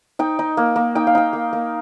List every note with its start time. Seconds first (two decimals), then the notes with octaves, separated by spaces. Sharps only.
0.19 D#4 G5
0.39 D#4
0.57 A#3
0.76 A#3
0.95 D#4 G5
1.07 F5
1.15 D#4 G5
1.33 A#3
1.53 A#3